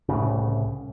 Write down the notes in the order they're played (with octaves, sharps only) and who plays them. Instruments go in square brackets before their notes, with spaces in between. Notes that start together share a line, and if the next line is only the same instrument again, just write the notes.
[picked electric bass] C2 A2 C#3